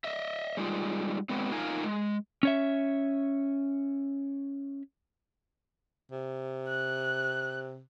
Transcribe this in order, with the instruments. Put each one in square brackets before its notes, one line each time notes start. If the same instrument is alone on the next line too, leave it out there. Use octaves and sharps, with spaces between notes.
[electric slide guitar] D#5 E5
G3 G#3 D#4 F4
F#3 G#3 B3 C4
D#4 F4 A#4 F5 G#5
G#3
[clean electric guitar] C#4 C#5 E5
[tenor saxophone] C3
[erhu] F#6